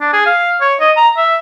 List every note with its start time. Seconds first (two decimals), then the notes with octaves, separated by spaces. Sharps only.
0.01 D4
0.13 G#4
0.26 F5
0.61 C#5
0.81 D#5
0.97 A#5
1.17 E5